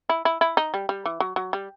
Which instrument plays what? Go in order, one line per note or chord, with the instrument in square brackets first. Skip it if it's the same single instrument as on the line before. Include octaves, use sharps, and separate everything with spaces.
[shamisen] E4
E4
E4
D#4
G3
G3
E3
F#3
F#3
G3